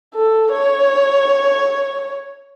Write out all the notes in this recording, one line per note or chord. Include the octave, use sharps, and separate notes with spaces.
A4
C#5